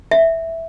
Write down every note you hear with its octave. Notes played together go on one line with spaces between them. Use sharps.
E5